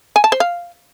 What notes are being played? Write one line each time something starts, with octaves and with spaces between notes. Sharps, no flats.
G#5
A5
C5
F5